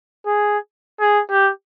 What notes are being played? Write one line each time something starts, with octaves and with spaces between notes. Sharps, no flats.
G#4
G#4
G4